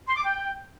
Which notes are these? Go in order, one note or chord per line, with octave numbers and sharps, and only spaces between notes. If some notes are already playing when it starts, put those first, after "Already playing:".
C6
D6
G5